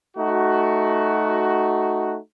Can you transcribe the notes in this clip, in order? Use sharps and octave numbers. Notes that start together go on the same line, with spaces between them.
A3 D#4 F#4